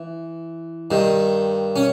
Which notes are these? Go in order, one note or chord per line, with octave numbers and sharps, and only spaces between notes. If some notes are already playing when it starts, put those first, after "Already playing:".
Already playing: E3
G2 D#3
C#4